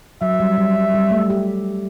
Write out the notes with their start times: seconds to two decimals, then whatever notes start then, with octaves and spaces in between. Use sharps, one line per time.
0.21 F#3 E5
0.40 G3
0.57 G3
0.94 G3
1.11 A3
1.30 G4